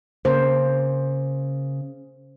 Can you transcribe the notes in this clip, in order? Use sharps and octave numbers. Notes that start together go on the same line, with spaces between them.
C#3 A#3 C5